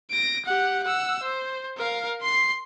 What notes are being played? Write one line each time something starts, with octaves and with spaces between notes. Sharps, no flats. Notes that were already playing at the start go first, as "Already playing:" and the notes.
A#6 D7
G4 F#5
F#5 E6
C5
A#4 F5
C6 C7